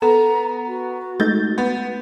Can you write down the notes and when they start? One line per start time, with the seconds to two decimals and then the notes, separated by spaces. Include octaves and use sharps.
0.02 B3 A4 A#5
0.68 F#4
1.20 G#3 A3 D#4 G6 A6
1.58 B3